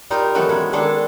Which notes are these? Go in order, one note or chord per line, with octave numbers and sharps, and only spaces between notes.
G3 D#4 F4 A#4
D#3 E3 F#3 B3 F#4 A4
G#3 C#4 F#4
D#3 G#3 D4 A4 D5